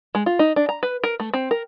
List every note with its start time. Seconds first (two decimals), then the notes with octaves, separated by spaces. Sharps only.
0.15 G#3
0.26 F4
0.39 D#4
0.56 D4
0.69 A#5
0.83 B4
1.04 A#4
1.20 A3
1.34 C4
1.51 A#4